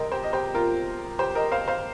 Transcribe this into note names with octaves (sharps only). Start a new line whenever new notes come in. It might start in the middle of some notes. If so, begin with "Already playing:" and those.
Already playing: C3 G3 A#4 D#5 G5 C6
G4 C5
D#5
G4 C5
F4 A#4
G4 C5
A#4 D#5
C5 F5
C5 F5